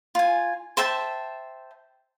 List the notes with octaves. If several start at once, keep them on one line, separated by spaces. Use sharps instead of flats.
F4 G#5
C5 E5 G5 A5